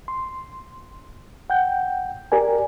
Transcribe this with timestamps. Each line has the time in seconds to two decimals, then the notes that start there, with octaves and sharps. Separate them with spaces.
0.08 C6
1.50 F#5 G5 G6
2.32 G4 A#4 D5 G#5